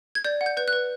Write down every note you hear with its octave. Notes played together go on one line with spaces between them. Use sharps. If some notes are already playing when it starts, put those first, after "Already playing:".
G#6
D5 G6
F#5
G6
B4 G6
F#6
B4